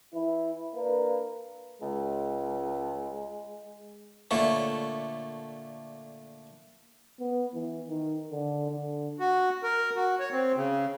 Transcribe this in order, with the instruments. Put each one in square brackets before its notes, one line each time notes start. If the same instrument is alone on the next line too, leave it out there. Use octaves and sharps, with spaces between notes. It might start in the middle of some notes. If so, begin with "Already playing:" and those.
[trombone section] E3 E4
A#3 D4 B4
[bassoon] C#2 [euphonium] G#3
[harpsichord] A#2 D3 A3 C#5
[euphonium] B3
E3
D#3
D3
D3
[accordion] F#4
A#4
F#4
C#5
C4
C#3